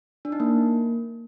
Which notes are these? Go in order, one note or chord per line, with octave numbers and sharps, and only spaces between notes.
D4
D#4
A#3